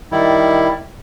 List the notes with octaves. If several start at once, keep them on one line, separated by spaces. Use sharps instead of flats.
D#3 G3 E4